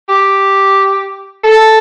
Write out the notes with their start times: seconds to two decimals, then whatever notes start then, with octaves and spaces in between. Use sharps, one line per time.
0.09 G4
1.44 A4